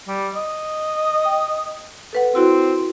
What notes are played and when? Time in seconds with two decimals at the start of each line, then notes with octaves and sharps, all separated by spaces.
0.08 G3
0.35 D#5
1.25 G5
2.13 A4 B4 F#5
2.35 C4 E4 F#4 E6